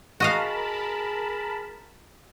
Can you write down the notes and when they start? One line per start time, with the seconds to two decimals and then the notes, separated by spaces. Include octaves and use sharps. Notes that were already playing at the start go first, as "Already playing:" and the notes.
0.20 F#4 G#4 A#4 D#5 F5 A5 B5